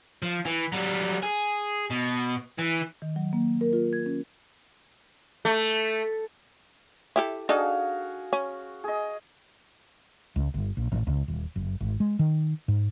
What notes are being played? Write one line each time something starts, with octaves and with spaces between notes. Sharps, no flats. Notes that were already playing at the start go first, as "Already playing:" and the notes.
F3
E3
F#3 G3
G#4
B2
E3
D#3
F#3
A#3
A#4
F4
G#6
C#4
A3
E4 G4 A4
D4 D#4 F#4 G#4 A4 F5
C#4
G#4 D#5
C#2
G1
A#1
A1
C#2
D#1
F#1
G#1
G#3
D#3
G#2